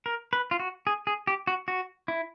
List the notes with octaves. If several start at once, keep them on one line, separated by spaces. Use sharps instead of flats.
A#4
B4
F4
F#4
G#4
G#4
G4
F#4
F#4
E4